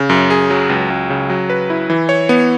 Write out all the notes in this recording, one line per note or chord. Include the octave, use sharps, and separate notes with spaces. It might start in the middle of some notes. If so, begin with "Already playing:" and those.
Already playing: C#3
F#2
G#4
F#3
C#2
C#2
C#3
F#3
B4
E4
E3
C#5
B3